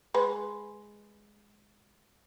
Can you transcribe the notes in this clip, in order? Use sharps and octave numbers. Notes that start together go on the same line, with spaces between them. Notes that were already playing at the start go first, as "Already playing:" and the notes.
G#3 B4